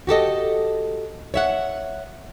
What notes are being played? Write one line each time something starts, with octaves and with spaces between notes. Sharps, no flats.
F#4 G4 A4 D#5
C#5 E5 F#5